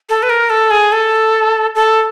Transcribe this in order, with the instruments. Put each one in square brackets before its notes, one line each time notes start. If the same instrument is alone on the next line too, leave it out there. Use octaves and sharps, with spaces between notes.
[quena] A4
B4
A#4
A4
G#4
A4
A4